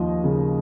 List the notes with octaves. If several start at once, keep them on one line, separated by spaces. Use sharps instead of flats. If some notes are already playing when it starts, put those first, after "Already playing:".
Already playing: D#2 F3 D#5
C#3